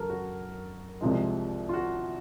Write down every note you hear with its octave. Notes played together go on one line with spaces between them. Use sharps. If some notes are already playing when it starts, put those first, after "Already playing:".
Already playing: F#2 C#3 F#3 A4 A#4
F#4
C2 C3 F3 G#3
F4
F#4